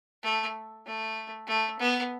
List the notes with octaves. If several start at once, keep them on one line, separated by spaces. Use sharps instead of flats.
A3
A3
A3
B3